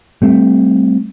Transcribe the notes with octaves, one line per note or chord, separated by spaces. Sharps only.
G3 A3 C4